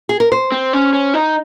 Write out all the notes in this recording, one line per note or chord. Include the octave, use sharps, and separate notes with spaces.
G#4
A#4
C5
C4
C#4
C#4
D#4